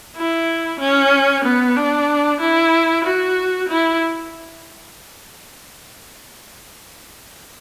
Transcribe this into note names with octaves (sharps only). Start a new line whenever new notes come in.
E4
C#4
B3
D4
E4
F#4
E4